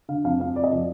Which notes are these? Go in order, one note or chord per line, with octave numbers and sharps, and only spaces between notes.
D3 F5
F2 F5
F2 F5
F2 D5
D#5
F3 D5